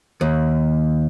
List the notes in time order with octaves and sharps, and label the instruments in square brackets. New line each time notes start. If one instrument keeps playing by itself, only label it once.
[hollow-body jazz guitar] D#2